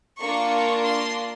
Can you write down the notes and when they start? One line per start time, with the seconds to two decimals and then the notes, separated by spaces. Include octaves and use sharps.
0.20 A#3 D4 F4 C#6
0.83 C6